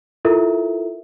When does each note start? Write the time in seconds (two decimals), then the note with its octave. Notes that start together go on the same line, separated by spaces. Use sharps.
0.25 E4 F4 A4 A#4 E5